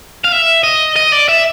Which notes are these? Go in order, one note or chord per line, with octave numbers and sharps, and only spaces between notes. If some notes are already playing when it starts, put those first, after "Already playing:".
F5
E5
D#5
D#5
D5
E5